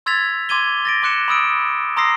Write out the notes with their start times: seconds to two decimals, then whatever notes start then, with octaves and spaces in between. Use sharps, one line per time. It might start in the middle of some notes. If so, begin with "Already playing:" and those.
0.06 C6 E6 G#6 A6 B6 F7
0.49 C6 D6 G#6 D#7 G7
0.85 A6 A#6 D7
1.03 C6 D6 F#6 C#7 E7
1.28 B5 D#6 E6 D7
1.97 A#5 C6 D#6 E6 A#6 C7